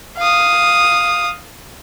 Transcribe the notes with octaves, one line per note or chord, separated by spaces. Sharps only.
F5 D#6